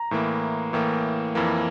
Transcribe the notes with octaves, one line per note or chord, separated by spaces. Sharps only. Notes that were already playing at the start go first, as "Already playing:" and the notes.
Already playing: A#5
A2 E3 A#3
A2 E3 A#3
F2 E3 A#3